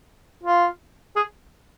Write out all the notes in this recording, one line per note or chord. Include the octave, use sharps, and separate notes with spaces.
F4
G#4